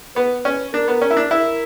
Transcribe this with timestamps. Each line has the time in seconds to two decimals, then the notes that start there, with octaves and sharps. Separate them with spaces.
0.16 B3 B4
0.45 C#4
0.73 D4 A#4
0.88 B3
1.02 C#4
1.11 E4
1.17 D4
1.30 E4 A#4